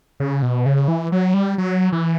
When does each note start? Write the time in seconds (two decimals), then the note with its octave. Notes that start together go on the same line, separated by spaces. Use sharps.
0.20 C#3
0.42 B2
0.66 C#3
0.88 E3
1.12 F#3
1.34 G3
1.58 F#3
1.92 E3